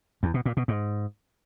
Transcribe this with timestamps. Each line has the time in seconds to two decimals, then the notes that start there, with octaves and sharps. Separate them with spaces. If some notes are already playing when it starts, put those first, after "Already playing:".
0.23 E2
0.34 B2
0.46 A#2
0.57 B2
0.68 G#2